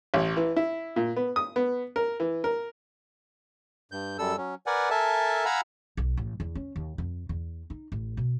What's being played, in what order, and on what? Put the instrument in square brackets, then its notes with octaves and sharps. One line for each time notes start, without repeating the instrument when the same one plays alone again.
[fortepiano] A1
E3
E4
A#2
B3
D#6
B3
A#4
E3
A#4
[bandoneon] G2 G6
F#2 G3 A4 E6
F#3 C#4
A#4 B4 D5 F#5 G#5
A4 A#4 E5 G#5 A5
F5 F#5 G#5 A#5 B5 E6
[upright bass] B1
A1
E2
C#4
D#2
F2
E2
D#4
A1
B2